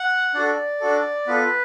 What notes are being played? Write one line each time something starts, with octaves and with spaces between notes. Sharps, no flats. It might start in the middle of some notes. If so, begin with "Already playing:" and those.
Already playing: F#5
D4 F#4 A4 D5
D4 F#4 A4
B3 F4 A4 B4